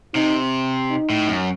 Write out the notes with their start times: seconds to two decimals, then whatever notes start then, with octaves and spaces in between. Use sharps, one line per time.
0.14 C3 D#4
0.90 D#4
1.10 A2
1.28 F#2